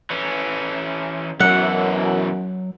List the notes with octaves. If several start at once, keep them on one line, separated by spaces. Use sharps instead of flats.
E3 C#4
F#2 B2 E3 F#3 F#5